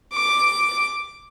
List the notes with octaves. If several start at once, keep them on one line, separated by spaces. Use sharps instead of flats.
D6